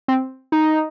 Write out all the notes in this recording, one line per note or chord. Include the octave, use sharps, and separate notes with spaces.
C4
D#4